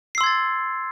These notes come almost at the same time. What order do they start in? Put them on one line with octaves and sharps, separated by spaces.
C7 E6 C6 G#6 A6